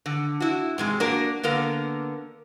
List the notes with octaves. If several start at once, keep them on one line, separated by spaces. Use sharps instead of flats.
D3
E4 F#4
G#2 C3 G#3
A#3 D4 F#4 A#4
D3 A#3 B3 A#4